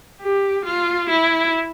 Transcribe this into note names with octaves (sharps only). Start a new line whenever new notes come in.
G4
F4
E4